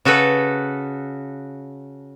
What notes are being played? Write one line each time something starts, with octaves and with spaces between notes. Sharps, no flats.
C#3 F#4 A4 B4